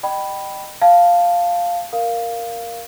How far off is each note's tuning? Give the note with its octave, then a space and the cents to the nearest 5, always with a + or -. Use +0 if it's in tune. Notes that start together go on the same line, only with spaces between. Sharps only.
D#5 -40 G5 -15 B5 +0
F5 +0 A5 +0
A#4 +0 F5 +0